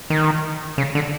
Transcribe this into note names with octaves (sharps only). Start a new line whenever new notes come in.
D#3
C#3
D3